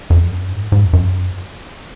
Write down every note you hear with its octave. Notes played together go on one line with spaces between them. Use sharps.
F2
F#2
G#2
G#2
F2
F#2